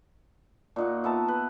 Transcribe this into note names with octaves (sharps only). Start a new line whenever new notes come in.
A#2 D#4 F#4
B3 E5 A5 A#5
B4